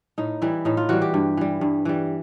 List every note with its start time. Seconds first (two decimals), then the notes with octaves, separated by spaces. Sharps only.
0.18 A2 D#4
0.42 E3 G3 E4
0.65 A2 D#4
0.77 F4
0.89 E3 G3 F#4
1.02 G4
1.14 G2
1.37 E3 G3
1.61 G2
1.85 E3 G3